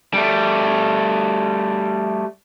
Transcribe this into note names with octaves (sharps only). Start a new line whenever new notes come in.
G3 A3